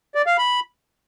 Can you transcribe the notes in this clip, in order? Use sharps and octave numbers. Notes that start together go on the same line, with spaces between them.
D5
F5
B5